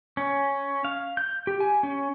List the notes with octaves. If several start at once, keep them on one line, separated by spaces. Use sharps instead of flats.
C#4
F5
G6
G4
G#5
C#4